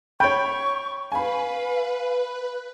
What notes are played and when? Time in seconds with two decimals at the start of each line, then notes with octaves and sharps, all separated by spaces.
0.20 C#5 G5 B5 C#6
1.12 B4 F5 G#5 B5